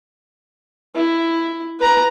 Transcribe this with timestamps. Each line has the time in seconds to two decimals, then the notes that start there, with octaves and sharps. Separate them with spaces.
0.95 E4
1.80 B4 A#5